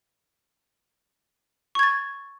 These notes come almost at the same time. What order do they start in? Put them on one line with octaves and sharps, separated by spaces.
C#6 G#6 A6